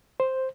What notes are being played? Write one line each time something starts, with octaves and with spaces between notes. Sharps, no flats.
C5